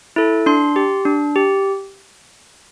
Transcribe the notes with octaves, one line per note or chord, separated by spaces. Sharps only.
E4 A4
D4 C6
G4
D4
G4